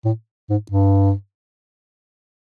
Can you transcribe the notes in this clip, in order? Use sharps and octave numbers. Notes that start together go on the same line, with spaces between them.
A2
G#2
G2